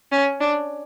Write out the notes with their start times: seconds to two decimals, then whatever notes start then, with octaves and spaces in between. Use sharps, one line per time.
0.12 C#4
0.40 D4